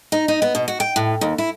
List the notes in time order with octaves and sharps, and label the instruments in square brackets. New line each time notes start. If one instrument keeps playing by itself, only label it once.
[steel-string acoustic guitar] D#4
D#4
B3
B2
F#4
G5
A2
D#2
E4